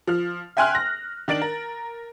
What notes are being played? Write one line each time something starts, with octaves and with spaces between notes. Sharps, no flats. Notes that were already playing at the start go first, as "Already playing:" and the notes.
F3 F6
E5 G5 G#5 C6 F6 F#6
A#6
D#3 D4 A6 D7 F#7
A#4